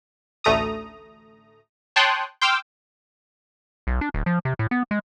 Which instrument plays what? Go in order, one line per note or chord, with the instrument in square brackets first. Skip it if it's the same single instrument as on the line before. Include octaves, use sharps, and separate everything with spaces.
[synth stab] A1 D2 A3 A#5 D#6
C#5 G5 A5 C6 D#6 F#6
G5 C6 D6 E6 F6 G6
[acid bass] B1
D4
D1
F3
C3
A2
B3
G#3